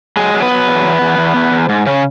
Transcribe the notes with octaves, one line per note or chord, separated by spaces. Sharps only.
F#3 G#3 G#4
F#3 G#4
B3 B4
F#3
E2
E2
E2
E2
E2
E2
G#2
C#3 C#4